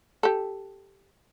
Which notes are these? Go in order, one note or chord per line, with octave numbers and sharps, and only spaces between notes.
G4 A4